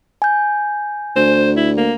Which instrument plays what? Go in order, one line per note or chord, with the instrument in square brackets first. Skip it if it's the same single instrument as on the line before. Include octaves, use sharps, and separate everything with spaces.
[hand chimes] G#5 G6
[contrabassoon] D2 [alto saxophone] C5
[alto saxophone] E4
A#3